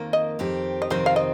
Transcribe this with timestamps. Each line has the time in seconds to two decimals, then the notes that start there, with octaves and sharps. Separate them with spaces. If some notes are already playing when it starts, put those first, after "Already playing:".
Already playing: F2 D#3 A#3
0.13 D#5
0.39 F2 D#3 C4 G4
0.82 D#5
0.90 F2 C3 D#3 C4 C5
1.06 F5
1.16 D#5